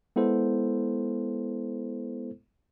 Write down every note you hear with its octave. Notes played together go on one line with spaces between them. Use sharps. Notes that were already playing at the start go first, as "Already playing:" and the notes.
G#3 B3 E4 A4 C5